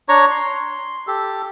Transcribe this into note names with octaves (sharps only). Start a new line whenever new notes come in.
D4 C#5 A#5 C#6
C6
G4 A4